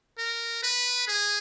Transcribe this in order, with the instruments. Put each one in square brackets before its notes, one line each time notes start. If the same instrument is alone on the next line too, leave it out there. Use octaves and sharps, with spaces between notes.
[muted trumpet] A#4
B4
G#4